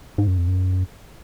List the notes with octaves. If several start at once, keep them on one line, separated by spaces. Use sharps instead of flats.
G#2
F#2
F2
F#2